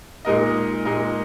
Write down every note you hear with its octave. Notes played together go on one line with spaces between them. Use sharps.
A#2 G#3 D#4 A#4 D#5
A#2 G#3 D#4 A#4 D#5